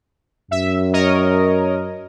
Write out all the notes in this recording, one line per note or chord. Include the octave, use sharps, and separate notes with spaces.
F#2 E5
A#4 C#5 D#5